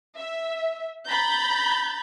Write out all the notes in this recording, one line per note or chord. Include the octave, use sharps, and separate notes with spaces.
E5
A#5 B5 G6 A6